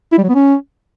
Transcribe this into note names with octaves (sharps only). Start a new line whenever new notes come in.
E4
G3
F#3
B3
C#4